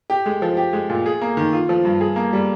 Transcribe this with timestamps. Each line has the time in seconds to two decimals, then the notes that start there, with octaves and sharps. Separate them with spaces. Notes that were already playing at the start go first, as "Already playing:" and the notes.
0.10 G4
0.26 G#3
0.42 F3
0.57 G4
0.73 G#3
0.90 A#2
1.06 G#4
1.21 A#3
1.37 D#3
1.53 F4
1.69 F3
1.85 G2
2.01 G#4
2.16 A#3
2.33 G3